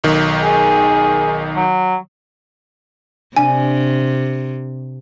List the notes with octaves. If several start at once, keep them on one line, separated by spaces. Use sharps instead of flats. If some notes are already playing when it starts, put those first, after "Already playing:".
B1 D#3
G#4
F#3
C3 D4 G#5